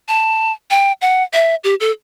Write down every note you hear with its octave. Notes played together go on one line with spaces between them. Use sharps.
A5
G5
F#5
E5
G4
A4